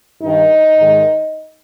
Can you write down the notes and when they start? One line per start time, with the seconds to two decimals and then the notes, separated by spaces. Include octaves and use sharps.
0.21 G2 D#3 D#4
0.79 G#2 D#3